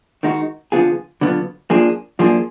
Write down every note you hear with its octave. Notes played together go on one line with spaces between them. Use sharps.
D#3 G#3 D#4 F#4
D3 F3 B3 F4 G#4
D3 F#3 B3 F4
F2 F3 A#3 D4 G#4
F#2 F3 A#3 D4 G#4